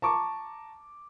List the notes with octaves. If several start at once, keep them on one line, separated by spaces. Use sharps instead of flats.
A5 A#5 C#6 D6